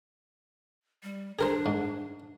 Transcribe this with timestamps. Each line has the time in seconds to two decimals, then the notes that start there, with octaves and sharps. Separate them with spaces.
1.03 G3
1.39 D4 G#4 A#4 C5
1.66 G#2